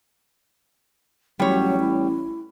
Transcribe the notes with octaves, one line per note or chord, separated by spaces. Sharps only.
A1 F#3 G3 C#5
E4